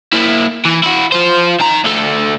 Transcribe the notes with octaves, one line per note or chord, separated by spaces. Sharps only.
A#3 E4
E3
E4 F#4
F4 C5
D#3 A#5
D2 A4